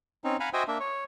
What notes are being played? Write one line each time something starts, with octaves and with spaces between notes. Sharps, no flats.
C4 C#4 D#4
F5 F#5 G#5 A#5 B5
F#4 C5 D#5 E5 G5 G#5
A#3 D4 E5
C#5